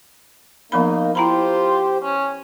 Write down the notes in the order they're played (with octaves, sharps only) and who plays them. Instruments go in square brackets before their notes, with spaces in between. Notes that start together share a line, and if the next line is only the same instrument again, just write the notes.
[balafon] F3 B3 B5 [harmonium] A#3 D#4
[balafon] E4 A#5 B5 [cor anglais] F4 [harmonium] G4 C5
[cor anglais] C#4